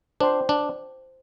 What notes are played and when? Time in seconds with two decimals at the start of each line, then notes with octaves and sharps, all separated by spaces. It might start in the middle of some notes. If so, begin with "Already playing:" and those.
0.20 D4 C5 G5 C6
0.49 D4